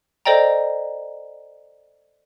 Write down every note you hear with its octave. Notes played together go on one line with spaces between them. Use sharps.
A4 C5 D5 D#5 G5 A#5